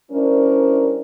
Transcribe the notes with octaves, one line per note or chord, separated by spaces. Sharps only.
G3 C#4 D4 E4 A#4 C5